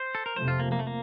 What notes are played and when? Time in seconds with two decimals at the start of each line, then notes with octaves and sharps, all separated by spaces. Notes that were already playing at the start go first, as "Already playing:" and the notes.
Already playing: C5
0.15 A4
0.26 A#4
0.36 F2 C3 F3 A3 C5
0.48 F4
0.60 A#3
0.72 A#3
0.79 A3
0.87 A#3